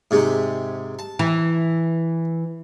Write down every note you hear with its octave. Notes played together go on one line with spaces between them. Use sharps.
G#2 C3 G#3
A5
E3